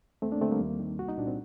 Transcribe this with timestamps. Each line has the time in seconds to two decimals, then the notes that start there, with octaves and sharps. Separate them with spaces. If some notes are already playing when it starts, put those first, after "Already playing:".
0.22 D#2 A3 C4
0.32 A#3 D4
0.41 D3 A3 C4
0.51 G3 A#3
0.61 D#2
0.80 D#3
0.99 C2 F#4
1.08 D#4
1.18 A#2 D4
1.27 C4